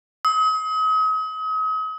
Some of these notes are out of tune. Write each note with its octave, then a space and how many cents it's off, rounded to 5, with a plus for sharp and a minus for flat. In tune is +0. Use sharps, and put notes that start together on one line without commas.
D#6 +40